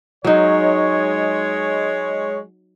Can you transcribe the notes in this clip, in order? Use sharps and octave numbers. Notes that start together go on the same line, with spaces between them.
F#3 G#3 D#4 C#5